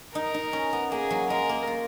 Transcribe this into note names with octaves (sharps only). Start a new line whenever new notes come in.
D#4 A#4
D#4
C#4
B3
A#3 G#4
F#3
G#3 A#4
A#3
F4